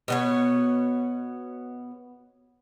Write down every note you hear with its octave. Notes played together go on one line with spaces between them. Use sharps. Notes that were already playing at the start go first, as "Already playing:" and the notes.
B2 B3 C#5